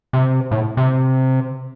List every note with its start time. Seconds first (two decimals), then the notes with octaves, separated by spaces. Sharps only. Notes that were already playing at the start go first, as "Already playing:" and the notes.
0.13 C3
0.51 A2
0.77 C3